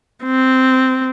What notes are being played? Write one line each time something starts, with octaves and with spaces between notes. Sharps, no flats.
C4